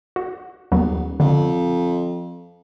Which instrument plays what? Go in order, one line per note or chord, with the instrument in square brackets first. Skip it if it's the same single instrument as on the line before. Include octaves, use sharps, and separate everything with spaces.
[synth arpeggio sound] F#4
[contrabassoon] D#1 [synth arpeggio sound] D#2 F#3 B3
[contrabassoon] F2 [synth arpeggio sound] D3